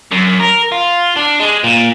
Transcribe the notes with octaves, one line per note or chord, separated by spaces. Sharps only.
F#2
A#4
F4
D4
G#3
A#2